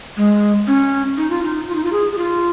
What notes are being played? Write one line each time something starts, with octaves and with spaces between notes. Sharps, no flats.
G#3
C#4
D#4
F4
D#4
F4
D#4
F4
G#4
G#4
F4